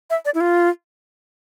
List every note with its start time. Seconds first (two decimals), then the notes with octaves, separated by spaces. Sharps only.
0.10 E5
0.25 D5
0.34 E4
0.40 F4